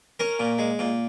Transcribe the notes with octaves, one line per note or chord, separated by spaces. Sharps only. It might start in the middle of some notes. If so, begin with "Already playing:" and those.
C#4 A#4
A#2
G#3
A#2